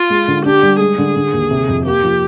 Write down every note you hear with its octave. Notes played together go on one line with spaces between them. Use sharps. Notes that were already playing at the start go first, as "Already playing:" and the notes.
Already playing: F4
G#3
D3
D4 G4
G3
G#3 G#4
D3
D3
D#2
C3
F2
A#3 G4
F3